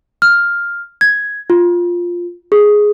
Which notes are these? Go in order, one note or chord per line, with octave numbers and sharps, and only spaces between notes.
F6
G#6
F4
G#4